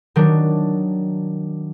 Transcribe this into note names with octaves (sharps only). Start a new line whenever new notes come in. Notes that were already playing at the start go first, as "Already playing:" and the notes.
D#3 F#3 D4